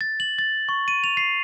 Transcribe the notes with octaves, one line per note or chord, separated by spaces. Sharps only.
A6
F#7
A6
C#6
D#7
F7
C7